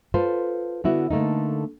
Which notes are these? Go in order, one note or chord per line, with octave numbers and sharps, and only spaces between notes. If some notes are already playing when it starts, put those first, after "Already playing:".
F4 A4 B4 C5
D3 B3 E4 F#4
D3 A3 A#3 D#4